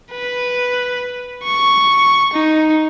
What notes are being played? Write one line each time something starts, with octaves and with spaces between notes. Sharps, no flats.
B4
C#6
D#4